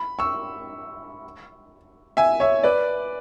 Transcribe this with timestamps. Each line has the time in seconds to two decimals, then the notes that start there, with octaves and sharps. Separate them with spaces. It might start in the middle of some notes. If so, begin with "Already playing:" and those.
Already playing: B5
0.19 C#6 E6
2.17 E5 G#5
2.40 C#5 E5
2.63 B4 D5